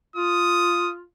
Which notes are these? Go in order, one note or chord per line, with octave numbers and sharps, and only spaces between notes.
F4 D#6